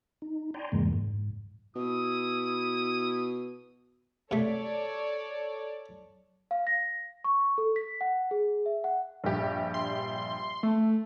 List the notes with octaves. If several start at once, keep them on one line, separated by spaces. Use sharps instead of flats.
D#4
D5 G5 G#5 A#5 C6
F2 G#2 C#3 E3 G#3 A#3
G#2
B2 E4 D#6
C3 A3 A4 C#5 D5
F5
A#6
C#6
A4
B6
F#5
G#4
E5
F#5
A#1 G2 G4
C6
A3